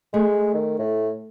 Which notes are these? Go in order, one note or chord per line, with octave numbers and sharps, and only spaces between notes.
G#3 A3
D#3
A2